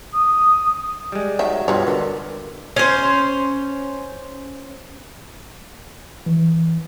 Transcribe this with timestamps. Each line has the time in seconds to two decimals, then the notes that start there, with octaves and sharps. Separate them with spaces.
0.13 D#6
1.12 G3 G#3
1.39 D#3 F#3 E5
1.68 G2 B2 F4 B4 C#5
1.87 D3 A#4
2.76 C#4 C5
6.26 E3